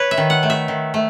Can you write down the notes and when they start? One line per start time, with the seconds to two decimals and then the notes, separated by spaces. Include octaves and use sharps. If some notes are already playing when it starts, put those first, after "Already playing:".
Already playing: B4 C#5
0.11 E5
0.18 D#3
0.30 F#5
0.43 A3
0.50 E5
0.68 D#3
0.94 A3